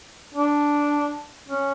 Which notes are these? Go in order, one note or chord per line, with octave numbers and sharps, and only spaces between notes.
D4
C#4